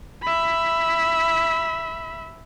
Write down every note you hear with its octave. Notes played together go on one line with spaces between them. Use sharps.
E5 B5